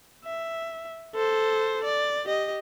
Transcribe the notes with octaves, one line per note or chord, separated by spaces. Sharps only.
E5
A4 C5
D5
G4 D#5